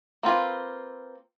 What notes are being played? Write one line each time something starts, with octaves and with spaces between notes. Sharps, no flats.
A#3 C4 F4 B4